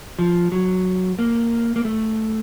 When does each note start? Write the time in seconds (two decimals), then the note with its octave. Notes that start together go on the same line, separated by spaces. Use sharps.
0.19 F3
0.52 F#3
1.19 A#3
1.76 A#3
1.85 A3